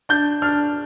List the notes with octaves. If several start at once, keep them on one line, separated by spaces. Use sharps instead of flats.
D4 G6
D4 F6